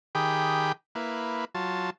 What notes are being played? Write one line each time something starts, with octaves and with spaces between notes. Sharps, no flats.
D#3 G4 G#4 G5 B5
A#3 E4 B4
F#3 F4 A5